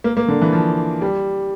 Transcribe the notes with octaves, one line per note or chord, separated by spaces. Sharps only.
A#3
A#3
D3
E3
F3
G3